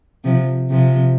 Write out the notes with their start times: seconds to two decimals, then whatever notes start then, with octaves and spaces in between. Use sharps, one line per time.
0.24 C3 F3
0.69 C3 F3